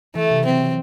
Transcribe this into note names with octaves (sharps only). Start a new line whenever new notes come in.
E3 A3
C3
F#3 C4